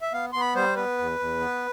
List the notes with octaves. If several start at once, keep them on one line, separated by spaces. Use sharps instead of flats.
E5
B3 F5
B3 C6
B5
G3 C5
B3 B4
E2
E2
B3